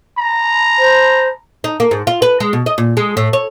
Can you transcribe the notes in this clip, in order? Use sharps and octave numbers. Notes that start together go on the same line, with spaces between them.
A#5
C5
D#4
A#3
G#2
F4
B4
G#3
B2
D#5
A#2
G#3
A2
C#5